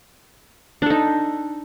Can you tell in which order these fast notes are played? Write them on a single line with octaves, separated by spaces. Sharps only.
D4 A4 D#4